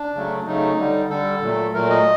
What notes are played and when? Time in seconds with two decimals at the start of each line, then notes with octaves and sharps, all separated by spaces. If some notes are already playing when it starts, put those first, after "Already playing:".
Already playing: D4
0.14 C#3 F#3 A3
0.46 C#3 F#3 A3 D#4
0.78 D3 G3
1.10 D3 G3 A4
1.42 A#2 F#3 A3
1.73 A#2 F#3 A3 A#4
1.90 D#5